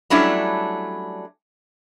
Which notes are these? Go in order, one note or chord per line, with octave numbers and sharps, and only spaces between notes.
F#3 G3 A3 C#4 D4 E4